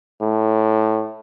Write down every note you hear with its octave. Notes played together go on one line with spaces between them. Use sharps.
A2